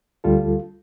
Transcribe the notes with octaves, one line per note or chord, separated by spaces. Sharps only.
D2 G3 F4 A4